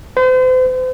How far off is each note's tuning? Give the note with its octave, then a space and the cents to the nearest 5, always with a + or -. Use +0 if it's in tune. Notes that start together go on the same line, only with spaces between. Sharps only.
C5 -40